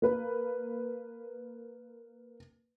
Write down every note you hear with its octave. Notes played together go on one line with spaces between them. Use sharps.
A#3 B4